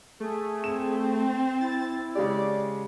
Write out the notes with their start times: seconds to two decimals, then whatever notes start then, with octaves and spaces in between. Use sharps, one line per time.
0.20 A3 G#4
0.64 C4 E7
1.61 E4 A6
2.15 C#3 G#3 G4 D5